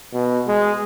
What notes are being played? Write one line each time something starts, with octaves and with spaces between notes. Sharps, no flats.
B2
G#3